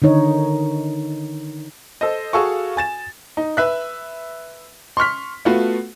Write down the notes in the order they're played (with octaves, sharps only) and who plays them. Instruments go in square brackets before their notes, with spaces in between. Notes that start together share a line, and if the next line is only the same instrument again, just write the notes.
[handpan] D3 D#3 D#4 C#5
[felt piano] A4 C5 D#5
F#4 G#4 A4 F5 C#6
G#5 A6 E7
[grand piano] D#4
B4 E5 F#6
C6 C#6 F6 B6
A3 B3 F4 F#4 B4